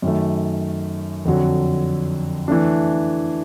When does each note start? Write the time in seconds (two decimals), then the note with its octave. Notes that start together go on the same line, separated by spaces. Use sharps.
0.02 F#2 D#3 F#3 A3
1.25 F2 D3 F#3
2.48 E3 A3 D4